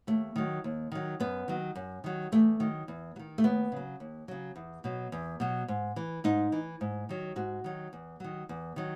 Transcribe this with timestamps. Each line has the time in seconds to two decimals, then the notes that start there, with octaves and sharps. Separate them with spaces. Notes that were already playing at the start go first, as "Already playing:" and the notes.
0.07 D#2 A3
0.36 D#3 F#3
0.64 D#2
0.92 D#3 F#3
1.20 F#2 B3
1.48 D#3 F#3
1.75 F#2
2.04 D#3 F#3
2.32 E2 A3
2.60 D#3 F#3
2.88 E2
3.16 F#3
3.19 D#3
3.38 A3
3.44 D#2 B3
3.72 C#3 F#3
4.00 D#2
4.28 C#3 F#3
4.56 E2
4.84 B2 F#3
5.12 E2
5.40 B2 F#3
5.68 G#2
5.96 E3
6.24 G#2 D#4
6.52 E3
6.81 G#2
7.09 D#3 F#3
7.36 G#2 F#4
7.64 D#3 F#3
7.93 E2
8.20 D#3 F#3
8.49 E2
8.76 D#3 F#3